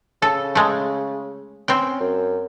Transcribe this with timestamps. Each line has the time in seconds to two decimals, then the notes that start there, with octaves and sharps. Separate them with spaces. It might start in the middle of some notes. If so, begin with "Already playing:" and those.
0.22 C#3 A4
0.55 G#3 A3
1.68 C4 C#4 G5
2.00 F#2